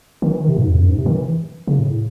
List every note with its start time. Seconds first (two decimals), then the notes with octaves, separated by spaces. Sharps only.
0.22 D#3
0.31 E3
0.40 D#3
0.48 C3
0.57 G#2
0.67 E2
0.79 F#2
0.89 G#2
0.98 C3
1.06 D#3
1.15 E3
1.67 C#3
1.79 A2